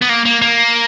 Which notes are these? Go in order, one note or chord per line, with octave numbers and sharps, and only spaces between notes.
B3
A#3
A#3
A#3